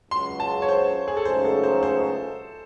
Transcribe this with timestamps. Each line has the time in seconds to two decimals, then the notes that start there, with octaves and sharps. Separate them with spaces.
0.11 C#2 C#3 F#3 C6
0.40 A5
0.62 C#5
0.69 C5
1.08 G#4
1.17 A4
1.25 C#2 C#3 F#3 A3 D#4 C5
1.45 A4
1.64 C5
1.83 C5